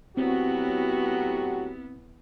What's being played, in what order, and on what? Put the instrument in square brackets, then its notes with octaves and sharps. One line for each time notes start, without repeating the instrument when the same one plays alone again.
[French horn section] A2 F#3 F#4 [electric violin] B3 E4 [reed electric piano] C4 [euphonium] G4